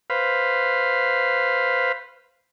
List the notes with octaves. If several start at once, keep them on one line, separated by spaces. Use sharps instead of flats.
B4 C5 F5